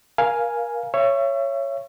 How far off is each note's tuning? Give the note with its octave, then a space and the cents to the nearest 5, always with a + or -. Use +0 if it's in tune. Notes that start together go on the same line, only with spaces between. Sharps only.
A#4 +30 F5 +0 G#5 +0
C#5 +0 E5 +35